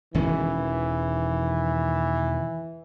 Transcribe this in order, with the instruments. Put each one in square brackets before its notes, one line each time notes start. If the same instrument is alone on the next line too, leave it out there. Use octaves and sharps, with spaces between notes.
[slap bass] E1 D#3 C#4 [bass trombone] E3